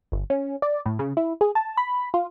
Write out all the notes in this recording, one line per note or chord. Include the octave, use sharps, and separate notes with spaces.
G1
C#4
D5
A2
C#3
E4
G#4
A5
B5
F4